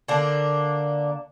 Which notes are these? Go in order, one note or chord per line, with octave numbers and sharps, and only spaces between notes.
D3 A#3 D4